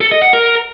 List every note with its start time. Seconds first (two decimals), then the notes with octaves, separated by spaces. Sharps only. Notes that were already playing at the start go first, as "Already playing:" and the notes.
0.01 A4
0.12 D#5
0.22 F#5
0.33 A#4